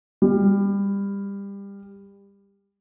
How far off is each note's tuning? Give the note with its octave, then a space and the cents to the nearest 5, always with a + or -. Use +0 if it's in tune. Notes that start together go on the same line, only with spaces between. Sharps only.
G3 +25